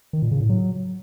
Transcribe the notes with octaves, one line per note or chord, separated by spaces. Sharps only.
D#3
A#2
C#3
A2
F#3